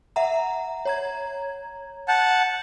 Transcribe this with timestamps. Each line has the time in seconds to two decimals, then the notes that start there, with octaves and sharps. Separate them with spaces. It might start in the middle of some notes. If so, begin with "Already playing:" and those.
0.16 E5 F#5 A#5
0.85 C#5 A#5 G#6
2.08 F#5 A5 G6